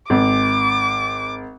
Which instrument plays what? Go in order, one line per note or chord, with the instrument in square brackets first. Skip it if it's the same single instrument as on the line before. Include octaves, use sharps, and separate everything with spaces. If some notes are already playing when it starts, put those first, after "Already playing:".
[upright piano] G#1 [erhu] D6